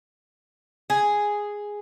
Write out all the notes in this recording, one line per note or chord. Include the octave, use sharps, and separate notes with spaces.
G#4